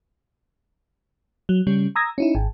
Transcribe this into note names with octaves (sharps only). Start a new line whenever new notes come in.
F#3
C#3 G3 C#4
A#5 D#6 E6 G#6 A#6
C#4 D#4 E4
G#1